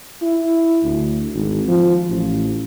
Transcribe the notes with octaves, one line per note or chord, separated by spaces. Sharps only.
E4
D2
G#1
F3
A1